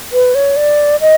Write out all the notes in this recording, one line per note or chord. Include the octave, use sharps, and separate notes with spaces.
B4
C#5
D5
D#5